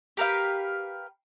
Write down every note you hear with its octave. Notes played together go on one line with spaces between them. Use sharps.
G4 A#4 B4 F5